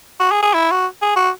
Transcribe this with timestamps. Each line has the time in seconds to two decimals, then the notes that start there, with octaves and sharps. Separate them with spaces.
0.20 F#4
0.32 G#4
0.43 G#4
0.54 E4
0.71 F#4
1.02 G#4
1.16 F#4